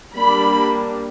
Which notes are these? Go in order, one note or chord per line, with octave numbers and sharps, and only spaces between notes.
G3 A#3 D4 B5